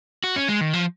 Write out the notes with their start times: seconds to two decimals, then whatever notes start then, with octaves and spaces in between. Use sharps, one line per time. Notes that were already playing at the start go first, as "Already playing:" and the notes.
0.24 F#4
0.36 C#4
0.48 G#3
0.61 D#3
0.73 F3